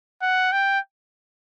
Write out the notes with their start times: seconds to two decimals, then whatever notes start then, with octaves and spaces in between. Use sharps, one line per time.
0.22 F#5
0.52 G5